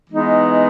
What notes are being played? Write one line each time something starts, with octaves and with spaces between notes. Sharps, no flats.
E3 G#3 B3 D#4